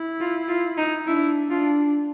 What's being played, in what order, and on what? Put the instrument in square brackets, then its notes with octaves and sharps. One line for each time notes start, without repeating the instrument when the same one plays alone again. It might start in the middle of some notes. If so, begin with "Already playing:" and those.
Already playing: [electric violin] E4
[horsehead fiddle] F4
F4
D#4
[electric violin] D4 [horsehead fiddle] E4
[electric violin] D4 [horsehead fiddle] F4